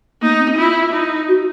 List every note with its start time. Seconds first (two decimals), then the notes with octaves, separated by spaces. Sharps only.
0.22 A#3 D#4
0.39 C4
0.58 E4 F4
0.93 D#4
1.29 F#4